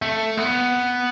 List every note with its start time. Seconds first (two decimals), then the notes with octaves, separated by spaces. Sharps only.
0.02 A3
0.37 B3